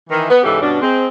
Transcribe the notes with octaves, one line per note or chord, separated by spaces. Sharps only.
D#3 E3
B3
G#2 C#3 E3 G4 A4
G2 B2 C#4 D4
G#3 C4